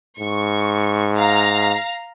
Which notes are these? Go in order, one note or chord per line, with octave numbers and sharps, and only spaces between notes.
G#2 C#6
F5 A#5